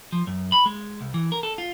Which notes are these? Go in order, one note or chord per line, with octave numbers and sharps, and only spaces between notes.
F3
F#2
B5
G#3
C2
E3
A#4
A4
F4